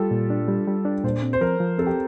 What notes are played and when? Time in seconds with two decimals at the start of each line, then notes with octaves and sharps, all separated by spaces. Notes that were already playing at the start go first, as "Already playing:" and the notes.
Already playing: G3 F4 G4 A4
0.11 A#2
0.30 D4
0.48 G3
0.68 G3
0.85 D4
1.04 A#2 C5
1.23 C4
1.33 C5
1.41 F3 A#4
1.60 F3
1.78 C4 A4
1.87 G4